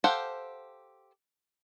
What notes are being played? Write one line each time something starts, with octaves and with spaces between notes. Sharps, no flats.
G4 A4 C5 F5 F#5